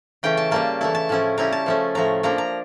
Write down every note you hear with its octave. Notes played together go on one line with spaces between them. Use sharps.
C#3 E3 A3 C#4 G5
A5
C#3 G3 A#3 A5
E3 A3 E4 A5
A5
A2 F3 C#4 E4
C#3 G3 C#4 E4 A#5
A5
F3 A3 C#4
A2 F3 A3 A#5
F3 A#3 D4 A#5
A#5